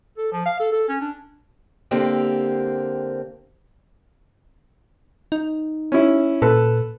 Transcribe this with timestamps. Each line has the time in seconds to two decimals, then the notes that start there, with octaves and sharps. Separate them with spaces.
0.18 A4
0.32 F3
0.46 F5
0.60 A4
0.72 A4
0.88 C#4
1.01 D4
1.91 D3 A#3 C4 G4
5.32 D#4
5.92 C#4 E4
6.42 A#2 A4 B4